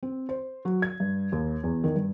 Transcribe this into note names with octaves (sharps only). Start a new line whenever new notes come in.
C4
C5
F#3
G#6
G2
D#2
E2
D#3
G2